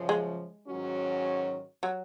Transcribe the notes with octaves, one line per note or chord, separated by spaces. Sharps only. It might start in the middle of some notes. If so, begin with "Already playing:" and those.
Already playing: F#2 C#3 F3
G#3
G#2 D#3 F#3 C#4 F#4
F#3